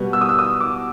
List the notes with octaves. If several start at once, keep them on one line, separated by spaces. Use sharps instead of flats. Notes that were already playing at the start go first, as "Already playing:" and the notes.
Already playing: B2 G3 B3
E6
D#6
E6
D#6
D6